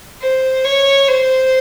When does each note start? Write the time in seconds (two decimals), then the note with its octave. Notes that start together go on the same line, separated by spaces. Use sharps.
0.22 C5
0.65 C#5
1.08 C5